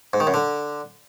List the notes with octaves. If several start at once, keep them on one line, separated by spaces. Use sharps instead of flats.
G#2
D#3
F#2
D3